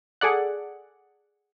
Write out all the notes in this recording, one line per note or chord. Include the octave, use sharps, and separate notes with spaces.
G#4 A4 D5 F#5